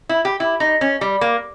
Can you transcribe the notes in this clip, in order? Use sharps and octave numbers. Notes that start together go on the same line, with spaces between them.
E4
G4
E4
D#4
C#4
G3
A#3